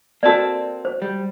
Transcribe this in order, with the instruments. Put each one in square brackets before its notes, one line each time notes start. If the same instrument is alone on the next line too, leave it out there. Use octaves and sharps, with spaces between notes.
[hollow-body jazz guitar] A#3 C4 A4 [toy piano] F#4 D5
[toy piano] C5
[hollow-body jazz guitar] G3